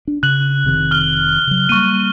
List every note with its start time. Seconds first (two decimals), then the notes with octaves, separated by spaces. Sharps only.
0.08 D4
0.23 C#3 F#6 F#7
0.64 F1 C3 D#3
0.91 F6 G7
1.47 C#3 F#3
1.69 G3 A#3 C#6 D#7